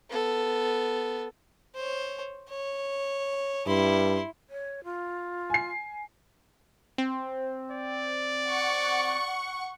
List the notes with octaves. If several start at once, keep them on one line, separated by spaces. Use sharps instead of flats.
B3 A4
C5 C#5
C#5
G2 E4 C6
C#5
F4
G#5 C7
C4
D5
F#5 C#6